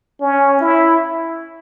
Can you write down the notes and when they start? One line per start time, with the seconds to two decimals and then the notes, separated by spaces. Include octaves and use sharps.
0.21 C#4
0.60 E4